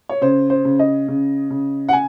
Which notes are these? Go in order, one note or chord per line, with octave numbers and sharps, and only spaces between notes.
C#5
C#3 C5
C5
C#3
D#5
C#3
C#3
F#5
G#5